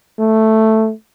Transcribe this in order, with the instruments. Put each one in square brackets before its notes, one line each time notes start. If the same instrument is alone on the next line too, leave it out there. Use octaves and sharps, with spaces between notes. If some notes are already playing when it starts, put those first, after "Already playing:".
[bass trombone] A3